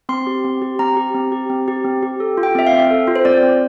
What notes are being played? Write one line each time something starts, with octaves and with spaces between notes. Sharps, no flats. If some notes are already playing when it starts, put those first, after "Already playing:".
C4 C6
G4
C4
G4
C4 A#5
G4
C4
G4
C4
G4
C4
G4
A4
F4
G5
C4 E5
F5
C4
A4
F4
C5
C4 D5
C4